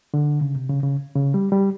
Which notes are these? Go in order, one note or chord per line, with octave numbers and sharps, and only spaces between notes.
D3
C#3
C3
C#3
C#3
C#3
G3
G3